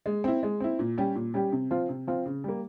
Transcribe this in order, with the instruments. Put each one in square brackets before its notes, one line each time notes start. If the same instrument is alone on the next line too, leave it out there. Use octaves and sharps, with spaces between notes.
[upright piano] G#3
C4 E4
G#3
C4 E4
A#2
G3 C#4 G4
A#2
G3 C#4 G4
C3
F3 C4 F4
C3
F3 C4 F4
C#3
G3 A#3